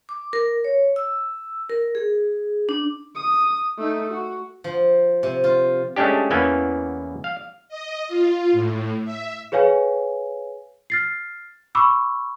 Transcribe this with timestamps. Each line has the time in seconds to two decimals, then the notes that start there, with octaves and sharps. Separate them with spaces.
0.09 D6
0.33 A#4
0.64 C#5
0.96 E6
1.70 A#4
1.95 G#4
2.69 D4
3.16 D#6
3.78 A3 D#4
4.11 F#4
4.64 F3
5.23 C3
5.44 F4
5.96 G#3 A3 C#4 D4 G4
6.30 E2 E3 A#3 B3 C#4 G#5
7.24 F5
7.69 D#5
8.08 F4
8.52 A2
9.05 E5
9.52 G#4 B4 C#5 F5 G#5
10.90 F6 A6 C7
11.75 B5 C#6 D6 E6